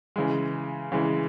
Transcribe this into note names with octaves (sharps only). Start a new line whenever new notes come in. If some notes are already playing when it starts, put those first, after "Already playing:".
C#3 E3 G#3
C#3 E3 G#3